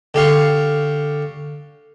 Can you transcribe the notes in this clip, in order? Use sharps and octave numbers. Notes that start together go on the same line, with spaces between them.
D3 G4 F5 C#6